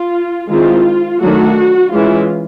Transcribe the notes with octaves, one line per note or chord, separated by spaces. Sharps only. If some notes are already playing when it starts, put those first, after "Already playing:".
Already playing: F4
D#3 G#3 C4 E4 F4
D#3 F#3 A3 D4 F#4
E3 G#3 C#4 E4 F4